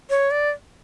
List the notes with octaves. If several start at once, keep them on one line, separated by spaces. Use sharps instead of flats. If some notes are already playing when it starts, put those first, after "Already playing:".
C#5
D5